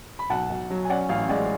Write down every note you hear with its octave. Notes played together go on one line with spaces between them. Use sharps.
B5
B1 F#5 A5
B1
F#3
G#5
C#4 D5 F#5
A1 C#5 F5
G#3 D5 F#5